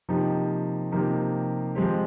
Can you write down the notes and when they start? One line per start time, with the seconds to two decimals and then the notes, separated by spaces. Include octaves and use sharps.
0.09 C3 F3 A#3 D#4 G4
0.92 C3 F3 A#3 D#4 G4
1.75 F3 G#3 C4 G4